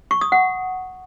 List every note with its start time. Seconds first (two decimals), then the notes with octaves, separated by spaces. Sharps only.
0.11 C#6
0.21 D#6
0.32 F#5